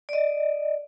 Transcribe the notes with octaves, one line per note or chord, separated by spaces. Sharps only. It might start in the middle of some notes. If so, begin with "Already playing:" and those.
D5 D#5